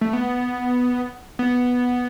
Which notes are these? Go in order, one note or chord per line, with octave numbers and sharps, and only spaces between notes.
A3
B3
B3